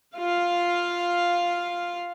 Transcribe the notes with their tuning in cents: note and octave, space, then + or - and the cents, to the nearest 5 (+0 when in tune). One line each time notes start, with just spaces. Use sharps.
F4 +0 F5 +0